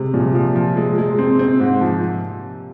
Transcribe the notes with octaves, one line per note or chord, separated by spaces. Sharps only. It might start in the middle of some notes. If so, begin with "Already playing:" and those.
Already playing: C3 G#3
A#2 F3
F3
F3
G#3
G#3
C4
C4
G#2
F3